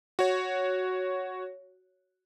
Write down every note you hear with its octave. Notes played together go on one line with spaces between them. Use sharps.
F#4 C#5